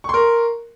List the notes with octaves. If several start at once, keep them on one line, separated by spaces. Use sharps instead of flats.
A#4 C6 C#6